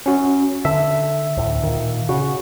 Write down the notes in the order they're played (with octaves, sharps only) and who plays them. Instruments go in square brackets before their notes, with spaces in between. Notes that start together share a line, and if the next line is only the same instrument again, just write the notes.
[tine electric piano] C#4 F#4
[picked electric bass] D3 [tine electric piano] E5
[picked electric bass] D2 A2
A#2 D#3
[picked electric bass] C#3 [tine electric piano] F#4